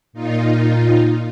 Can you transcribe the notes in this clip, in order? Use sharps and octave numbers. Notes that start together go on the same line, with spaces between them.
A#2 D#4 F4